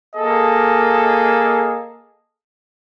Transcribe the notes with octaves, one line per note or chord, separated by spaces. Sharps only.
A#3 G#4 A4 D#5